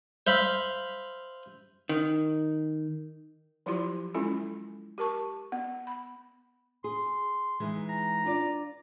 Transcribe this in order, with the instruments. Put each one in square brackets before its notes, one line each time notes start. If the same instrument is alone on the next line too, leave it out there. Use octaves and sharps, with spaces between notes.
[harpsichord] C5 E5 F5 B5
[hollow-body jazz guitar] D#3
[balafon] F3 F#3 E4 F4 G4 C6
G#3 C#4 E4 F4 A4
G4 A#4 A5 C#6
B3
B5
[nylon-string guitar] G#4 [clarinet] C6
[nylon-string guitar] E3 G#3 D#4
[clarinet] A#5
[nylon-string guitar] D4 F4 D5